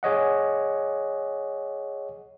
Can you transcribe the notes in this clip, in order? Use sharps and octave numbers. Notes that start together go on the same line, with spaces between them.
G#4 C#5 D#5 F#5